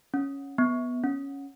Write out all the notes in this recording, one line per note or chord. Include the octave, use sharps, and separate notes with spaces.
C#4
B3
C#4